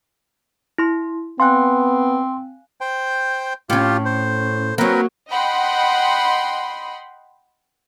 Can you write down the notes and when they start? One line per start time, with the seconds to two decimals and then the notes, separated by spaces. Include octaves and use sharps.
0.78 E4 C6
1.40 B3 C4 F5 G#5 C6 F#6
2.81 C5 G5
3.70 A2 C#4 F4 G4
4.05 C5
4.78 F#3 A#3 C4 A#4 B4
5.29 D#5 F#5 G5 B5 C6